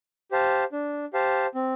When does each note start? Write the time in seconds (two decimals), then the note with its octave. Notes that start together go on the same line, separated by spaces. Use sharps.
0.31 G4 C5 F5 A5
0.72 D4
1.13 G4 C5 F5 A5
1.55 C4